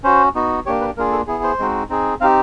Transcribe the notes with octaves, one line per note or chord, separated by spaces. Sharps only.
C#4 F#4 C5
B3 D#4 F#4
A#3 D4 G4 C#5
B4
A#3 D4 F4 G#4 A#4
A4
B3 E4 G#4
C5
G#3 C4 D#4 F#4
C4 D#4 G#4
C4 D#4 G4 F5